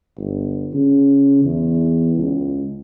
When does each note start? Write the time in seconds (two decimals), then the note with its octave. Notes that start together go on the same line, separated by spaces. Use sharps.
0.17 G1
0.74 C#3
1.44 E2
2.17 C#2